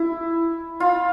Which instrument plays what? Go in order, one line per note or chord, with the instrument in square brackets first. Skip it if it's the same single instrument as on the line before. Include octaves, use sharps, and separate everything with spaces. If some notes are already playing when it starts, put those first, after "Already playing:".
Already playing: [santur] E4
F4